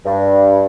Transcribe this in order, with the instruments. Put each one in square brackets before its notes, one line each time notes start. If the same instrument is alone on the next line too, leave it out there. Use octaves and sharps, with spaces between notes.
[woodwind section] G2